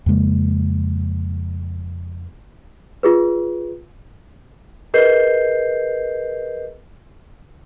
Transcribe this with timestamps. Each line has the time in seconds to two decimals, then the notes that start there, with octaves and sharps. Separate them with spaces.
0.06 F2 C#3 G#3 A#3
3.03 F4 G#4 B4
4.94 G#4 A#4 B4 D#5 G6 C7